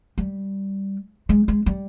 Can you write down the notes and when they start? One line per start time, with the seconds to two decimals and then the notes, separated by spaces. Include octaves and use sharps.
0.18 G3
1.29 G#3
1.48 G#3
1.66 G3